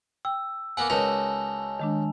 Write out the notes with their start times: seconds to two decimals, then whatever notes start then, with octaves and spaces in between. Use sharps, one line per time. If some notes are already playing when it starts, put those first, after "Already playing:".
0.25 G5 E6
0.77 A#3 B3 F#5 G#5
0.90 C#2 D#4 F#4 A#4 B4 C#5 A5 F7
1.80 D#3 G#3 D4